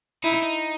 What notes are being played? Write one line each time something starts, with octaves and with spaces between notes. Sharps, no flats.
D#4 E4
D#4